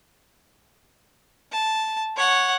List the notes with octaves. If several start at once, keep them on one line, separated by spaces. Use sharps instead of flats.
A5
C#5 F#5